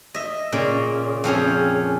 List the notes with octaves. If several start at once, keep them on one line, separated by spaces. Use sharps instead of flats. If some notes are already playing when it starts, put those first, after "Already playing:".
D#5 E5
A#2 C#3
F2 F3 C#4 G#4